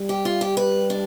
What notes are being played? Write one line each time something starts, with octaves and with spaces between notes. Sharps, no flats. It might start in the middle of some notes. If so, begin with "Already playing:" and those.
Already playing: G3
G4
F4
G4
B4
D4